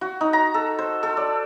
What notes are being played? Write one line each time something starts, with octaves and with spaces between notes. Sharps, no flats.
F#4
D#4
A#5
A4
C5
A4
D5